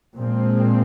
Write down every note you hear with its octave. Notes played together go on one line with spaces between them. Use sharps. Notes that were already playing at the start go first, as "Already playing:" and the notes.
A#2 F3 G#3 C4